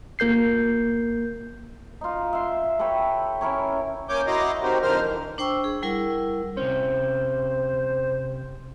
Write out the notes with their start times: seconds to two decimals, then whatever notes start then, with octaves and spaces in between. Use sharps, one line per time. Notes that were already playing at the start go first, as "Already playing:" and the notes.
0.19 G1 A#3 A#4 G6 C7
2.01 D#4 F4
2.33 E5 C6
2.79 A4 B4 C#5 G5
3.41 C#4 E4 A#4 C#5
4.09 A#3 C#4 C#5 G#5 D6 G6
4.27 E4 F#4 D#5 A#5 C6 D6
4.63 C4 D#4 F#4 G4 A#4 C5
4.82 F2 D3 D#3 A#4 C5 F6
5.02 D3 E3
5.38 D4 C5 G5 C#6 E6
5.64 G#4
5.83 G3 E4 A#4 F#5
6.57 C3 C#4 C5